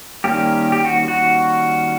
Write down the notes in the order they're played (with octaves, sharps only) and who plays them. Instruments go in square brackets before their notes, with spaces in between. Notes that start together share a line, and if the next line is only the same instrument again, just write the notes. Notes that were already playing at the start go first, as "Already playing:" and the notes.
[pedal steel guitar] D#3 G3 A#3 C#4 G4
G4
F#4
F#4